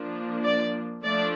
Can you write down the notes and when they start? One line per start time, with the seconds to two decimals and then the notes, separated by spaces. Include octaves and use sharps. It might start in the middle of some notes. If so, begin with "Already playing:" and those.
Already playing: F3 A#3 D4
0.44 D5
1.04 F3 A3 D4 D5